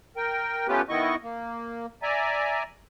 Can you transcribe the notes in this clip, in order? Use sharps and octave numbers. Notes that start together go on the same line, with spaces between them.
A#4 G5
A3 B3 C#4 F4 G4 B4
D#3 B3 E4 D#5 C#6
A#3
D5 E5 G#5 A#5